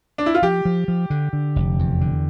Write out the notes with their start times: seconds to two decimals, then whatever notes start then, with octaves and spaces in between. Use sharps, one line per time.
0.18 D4
0.26 E4
0.35 F4
0.42 F3 G4
0.65 F3
0.88 F3
1.10 D3
1.33 D3
1.56 F1
1.79 E2
2.01 D3